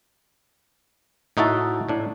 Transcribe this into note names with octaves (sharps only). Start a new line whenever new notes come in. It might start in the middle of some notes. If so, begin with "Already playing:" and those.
A2 D#4 F#4 E5 A5
A2 D4